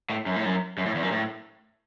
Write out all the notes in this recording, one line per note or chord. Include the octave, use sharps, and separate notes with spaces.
A2
F#2
A2
F#2
F#2
A2
E2
F#2
A2